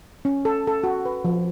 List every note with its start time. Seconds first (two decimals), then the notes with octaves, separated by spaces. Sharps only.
0.25 C#4
0.45 A4
0.67 A4
0.84 F#4
1.05 B4
1.25 F3